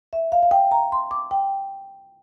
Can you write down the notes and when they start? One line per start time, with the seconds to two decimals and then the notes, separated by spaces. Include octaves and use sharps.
0.13 E5
0.32 F5
0.43 F5
0.51 G5
0.71 A#5
0.92 C6
1.11 D6
1.31 G5